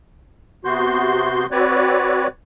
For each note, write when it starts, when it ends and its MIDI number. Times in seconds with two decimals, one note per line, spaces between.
0.65 1.46 48
0.65 1.46 59
0.65 1.46 66
0.65 1.46 84
0.65 1.46 91
1.51 2.27 60
1.51 2.27 66
1.51 2.27 71
1.51 2.27 73
1.51 2.27 74